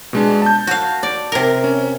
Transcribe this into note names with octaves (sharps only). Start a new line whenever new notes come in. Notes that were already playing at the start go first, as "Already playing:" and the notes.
B2 G#3 D4
A5 G6
F#4 F5
D5
C3 A#4
C#4